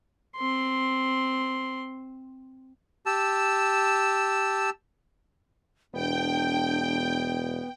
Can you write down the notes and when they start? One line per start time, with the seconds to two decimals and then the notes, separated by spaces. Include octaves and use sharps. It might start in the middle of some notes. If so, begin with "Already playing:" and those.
0.37 C4 C6
3.06 G4 A5 E6
5.94 E1 B3 D4 G5